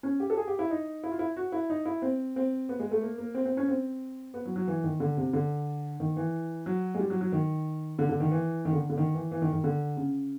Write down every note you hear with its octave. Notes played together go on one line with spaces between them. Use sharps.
C#4
G4
A4
G#4
G4
E4
D#4
E4
F4
E4
F#4
E4
D#4
E4
C4
C4
B3
G#3
A3
A#3
A#3
C4
C4
C#4
C4
B3
F#3
F#3
E3
D#3
D3
C3
D3
D#3
E3
F#3
G#3
G3
F#3
F#3
D#3
D3
D3
D#3
E3
D#3
D3
D3
D#3
E3
E3
D#3
D#3
D3
C#3